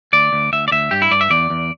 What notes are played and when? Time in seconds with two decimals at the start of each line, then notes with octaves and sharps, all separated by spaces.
0.13 D2 D5
0.33 D2
0.53 D2 E5
0.68 D5
0.72 D2 E5
0.91 G2 G4
1.02 E4
1.11 G2 D5
1.21 E5
1.30 E2 D5
1.50 E2